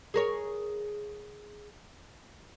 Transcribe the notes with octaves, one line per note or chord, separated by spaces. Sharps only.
G#4 A#4 C#5